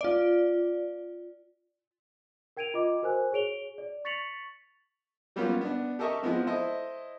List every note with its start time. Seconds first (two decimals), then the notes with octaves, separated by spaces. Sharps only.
0.01 F4 D5
2.57 A#4 G5 G#6 D7 D#7 F7
2.74 F4 D#5 D6
3.02 F#4 A#4 C5 G#5 F#6
3.32 G#4 C#5 D7 F7 G7
3.78 D5
4.05 C#6 A6 B6 C#7 F7 F#7
5.36 F#3 G3 A#3 B3 C#4 F4
5.61 B3 D4
5.99 G4 A4 A#4 D#5 E5 C#6
6.23 F3 G#3 B3 C4
6.47 E4 A4 C5 D#5